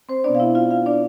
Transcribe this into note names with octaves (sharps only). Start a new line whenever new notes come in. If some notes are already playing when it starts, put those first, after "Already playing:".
C4 C5
B2 B3 D4 D5
F5
E4 E5
F4 F5
F4 F5
D4 D5